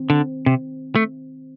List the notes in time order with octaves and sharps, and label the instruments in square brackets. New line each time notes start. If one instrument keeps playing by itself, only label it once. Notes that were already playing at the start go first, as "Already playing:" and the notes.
Already playing: [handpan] D#3 C4
[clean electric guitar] D3
C3
A3